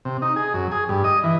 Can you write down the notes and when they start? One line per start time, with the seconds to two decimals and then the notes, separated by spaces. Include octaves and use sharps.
0.05 C3
0.22 D#4
0.36 G#4
0.54 F#2
0.72 G#4
0.89 G2
1.04 D#5
1.24 E3